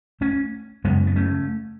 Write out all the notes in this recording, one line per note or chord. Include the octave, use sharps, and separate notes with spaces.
A3 C#4
F#2 C#3 G#3 B3
B3
A3 C#4